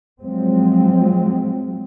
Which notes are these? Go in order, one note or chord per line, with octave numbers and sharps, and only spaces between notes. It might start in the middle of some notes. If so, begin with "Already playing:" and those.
F3 F#3 G#3 C4